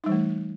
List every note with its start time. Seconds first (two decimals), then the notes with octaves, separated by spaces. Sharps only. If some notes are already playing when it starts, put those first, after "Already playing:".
0.04 D#4
0.06 G3
0.09 E3
0.12 A3